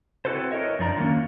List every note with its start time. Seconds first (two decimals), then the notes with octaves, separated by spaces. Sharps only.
0.25 C4 E4 F#4 A4 B4 C5
0.51 E4 A#4 C5 C#5 D#5 E5
0.79 F#2 F3 D4 A#5
0.97 D3 D#3 F#3 A#3 C#4